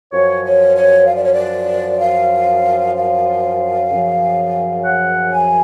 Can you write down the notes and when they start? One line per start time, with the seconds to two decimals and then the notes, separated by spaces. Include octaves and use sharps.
0.13 F#2 F3 C#5
0.45 C#5
0.76 C#5
1.07 F5
1.16 D5
1.24 C#5
1.33 D5
2.01 F5
2.96 F5
3.90 F#2 C#3 F3
4.85 F#5
5.32 G#5